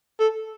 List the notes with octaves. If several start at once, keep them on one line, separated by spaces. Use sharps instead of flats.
A4